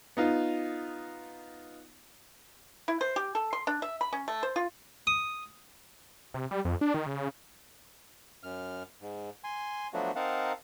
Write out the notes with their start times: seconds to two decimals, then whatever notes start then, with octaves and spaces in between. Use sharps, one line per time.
0.17 B3 D#4 F4
2.88 E4
3.01 C5
3.16 G4
3.35 A4
3.53 C6
3.67 D4
3.82 E5
4.01 B5
4.13 C#4
4.28 A3
4.43 C5
4.56 F4
5.07 D#6
6.34 C3
6.51 G3
6.65 F2
6.81 D4
6.94 D#3
7.06 C#3
8.43 F#2 F6
9.01 G#2
9.44 G#5 C6
9.94 F3 F#3 A3 B3 D4 F#4
10.16 C4 D#4 A#4 F5 F#5 A5